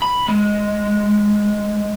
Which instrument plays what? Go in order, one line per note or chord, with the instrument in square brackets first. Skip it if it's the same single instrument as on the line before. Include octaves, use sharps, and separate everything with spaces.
[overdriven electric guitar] B5
G#3